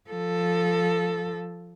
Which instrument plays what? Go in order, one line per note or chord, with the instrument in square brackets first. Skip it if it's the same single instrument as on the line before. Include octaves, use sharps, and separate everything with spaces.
[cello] F3 A4